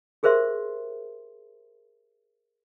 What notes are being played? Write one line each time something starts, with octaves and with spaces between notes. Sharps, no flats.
G4 G#4 A#4 C5 E5 C6